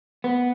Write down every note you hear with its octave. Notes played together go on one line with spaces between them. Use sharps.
B3